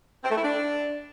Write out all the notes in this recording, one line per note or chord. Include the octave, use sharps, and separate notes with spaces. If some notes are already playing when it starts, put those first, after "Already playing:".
C4
A3
E4
D4